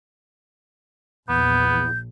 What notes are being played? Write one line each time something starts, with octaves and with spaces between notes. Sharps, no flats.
A#1 E2 B3 G6